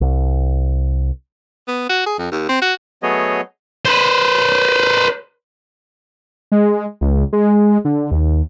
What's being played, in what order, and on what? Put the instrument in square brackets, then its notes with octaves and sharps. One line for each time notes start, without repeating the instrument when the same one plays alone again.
[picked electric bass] C2
[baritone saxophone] B3
F#4
G#4
F2
D#2
C4
F#4
[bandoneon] F#3 A3 B3 G#4 C#5 D#5
[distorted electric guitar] B4 C5
[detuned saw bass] G#3
C#2
G#3
D3
D#2